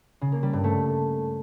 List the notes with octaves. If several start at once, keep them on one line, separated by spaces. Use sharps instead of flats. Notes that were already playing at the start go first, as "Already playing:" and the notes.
C#3
A#3
G3
G2
A3